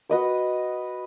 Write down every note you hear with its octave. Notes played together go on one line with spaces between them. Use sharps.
F#4 B4 D#5 D#6